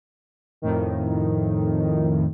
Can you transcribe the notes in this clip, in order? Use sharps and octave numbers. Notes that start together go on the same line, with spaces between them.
F2 A2 D#3